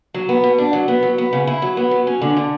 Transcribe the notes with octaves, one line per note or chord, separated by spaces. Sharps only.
F#3
B3
B2
D4
F#3
B3
F#3
B3
C#3
E4
F#3
B3
F#3
C#4
D3
D3